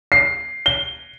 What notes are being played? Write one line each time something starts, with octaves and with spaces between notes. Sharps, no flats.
C7
G7